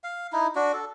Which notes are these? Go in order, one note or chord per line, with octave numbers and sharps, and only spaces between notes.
F5
D#4 E4
D4 F#4
A4